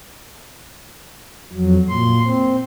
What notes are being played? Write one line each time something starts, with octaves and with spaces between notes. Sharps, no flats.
F2 F#3
A#2 C6
C4